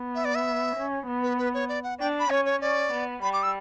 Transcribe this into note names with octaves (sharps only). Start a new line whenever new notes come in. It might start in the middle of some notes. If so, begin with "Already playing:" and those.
Already playing: B3
E5
D5
E5
C#4
B3
B4
B4
C#5
D5
F#5
D4 G5
B5
C#4 C#5
C#5
C#4 D5
B3
G3 B5
D6
E6